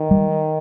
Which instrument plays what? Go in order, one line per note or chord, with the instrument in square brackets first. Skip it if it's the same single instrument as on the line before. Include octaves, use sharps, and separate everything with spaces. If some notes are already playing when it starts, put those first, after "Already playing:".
Already playing: [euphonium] D#3
[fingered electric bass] G3